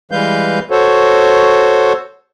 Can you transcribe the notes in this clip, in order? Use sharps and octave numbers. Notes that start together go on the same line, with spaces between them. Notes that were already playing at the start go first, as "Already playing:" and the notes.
E3 G3 G#3 B4 F5 G6
F#4 A4 C5 C#5